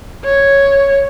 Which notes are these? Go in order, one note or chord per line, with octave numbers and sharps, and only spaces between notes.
C#5